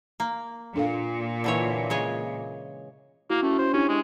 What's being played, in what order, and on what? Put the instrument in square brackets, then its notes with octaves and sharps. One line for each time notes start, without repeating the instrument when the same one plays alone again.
[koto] A#3
[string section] A#2 [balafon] D4 A4 F5
[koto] D3 E3 C#5
C#3 G#3 C#5
[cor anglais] A#3 [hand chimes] E4 F#4
[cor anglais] A3 [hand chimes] C#4
[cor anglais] C5
[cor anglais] C#4 [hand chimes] D4 E4 G4
[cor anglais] G#3